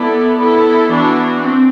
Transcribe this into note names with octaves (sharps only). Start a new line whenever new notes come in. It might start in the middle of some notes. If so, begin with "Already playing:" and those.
Already playing: B3 E4 A4 D5
B3 E4 A4
E3 B3 D4 F#4
C4